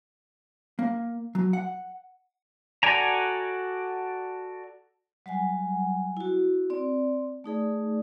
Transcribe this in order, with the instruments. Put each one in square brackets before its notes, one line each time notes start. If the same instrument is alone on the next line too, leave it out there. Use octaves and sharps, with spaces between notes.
[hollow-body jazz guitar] A#3
F#3
F#5
[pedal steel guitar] F#4 A4 D5 G#5 A#5
[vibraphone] F#3 G3 F#5 G#5
E4 F#4
C4 D5
A3 D#4 G#4 D5